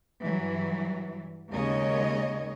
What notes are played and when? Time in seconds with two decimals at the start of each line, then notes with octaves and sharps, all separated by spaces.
0.23 G2 E3 F#3
1.51 D#2 C#3 G#3 A#3 C#5 D#5